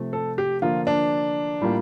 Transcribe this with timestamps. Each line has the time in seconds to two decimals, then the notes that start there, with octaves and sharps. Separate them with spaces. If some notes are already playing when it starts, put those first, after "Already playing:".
Already playing: C3 F3 A3
0.13 A4
0.38 G4
0.62 D3 F3 A#3 F4
0.87 D4
1.61 A2 G3 A#3 F4